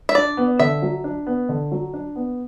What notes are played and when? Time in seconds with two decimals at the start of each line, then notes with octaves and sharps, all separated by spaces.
0.09 E5
0.15 D4 D5
0.37 B3
0.60 D3 E5
0.82 F#3
1.04 D4
1.27 B3
1.49 D3
1.72 F#3
1.94 D4
2.16 B3